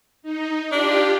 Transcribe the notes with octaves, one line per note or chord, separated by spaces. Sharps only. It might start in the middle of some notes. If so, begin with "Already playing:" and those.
D#4
D4 F4 G4